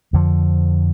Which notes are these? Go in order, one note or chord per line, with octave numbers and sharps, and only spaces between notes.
F2 D3 F3